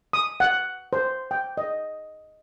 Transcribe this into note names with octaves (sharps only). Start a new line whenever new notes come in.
D#6
F#5
C5
G5
D#5